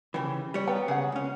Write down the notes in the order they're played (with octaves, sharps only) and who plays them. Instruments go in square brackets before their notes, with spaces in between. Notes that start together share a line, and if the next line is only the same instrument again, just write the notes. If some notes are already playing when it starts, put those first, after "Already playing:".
[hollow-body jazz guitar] C#3 E3 [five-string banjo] G4
[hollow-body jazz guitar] G3 C#5
[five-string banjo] B3 G5 A#5
[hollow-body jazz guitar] C#3 [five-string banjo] G#4 F#5
[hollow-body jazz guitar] C#2 C#4